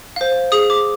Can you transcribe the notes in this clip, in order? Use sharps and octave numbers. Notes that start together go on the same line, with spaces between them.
C5 F5
G#4 D#6
D6